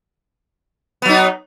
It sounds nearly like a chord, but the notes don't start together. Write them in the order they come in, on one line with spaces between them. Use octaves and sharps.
B3 F#3 D#4